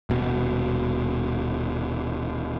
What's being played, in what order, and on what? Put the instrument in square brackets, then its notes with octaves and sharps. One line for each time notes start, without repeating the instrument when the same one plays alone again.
[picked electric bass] D#1 B2